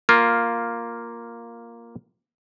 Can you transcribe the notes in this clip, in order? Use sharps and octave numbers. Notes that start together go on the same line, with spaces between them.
A#3 F4